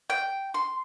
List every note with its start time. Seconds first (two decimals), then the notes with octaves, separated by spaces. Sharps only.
0.10 G5
0.54 C6